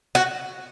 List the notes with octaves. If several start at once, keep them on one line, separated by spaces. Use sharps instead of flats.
F#4